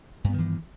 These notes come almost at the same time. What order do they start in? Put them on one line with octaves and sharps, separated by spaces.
G2 B3 D#3 E3